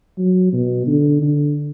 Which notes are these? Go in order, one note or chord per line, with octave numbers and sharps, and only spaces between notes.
F#3
B2
D3
D3